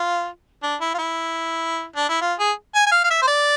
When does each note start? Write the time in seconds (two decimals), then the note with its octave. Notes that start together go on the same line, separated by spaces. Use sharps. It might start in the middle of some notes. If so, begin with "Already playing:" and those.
Already playing: F4
0.63 D4
0.81 E4
0.94 F4
0.98 E4
1.96 D4
2.09 E4
2.21 F4
2.39 G#4
2.75 G#5
2.86 G#5
2.92 F5
3.04 F5
3.11 E5
3.22 C5
3.27 D5